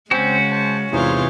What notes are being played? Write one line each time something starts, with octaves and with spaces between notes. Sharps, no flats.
C#3 G#3 C4 C#4 F#4 C5 G#5 G6
C5 A5
E2 G#2 C3 E3 F4 G#4 C5 C#5